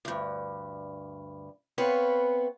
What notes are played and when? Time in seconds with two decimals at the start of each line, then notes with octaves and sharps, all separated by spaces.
0.05 D2 G2
1.78 B3 C4 B4 C#5 F5 G#5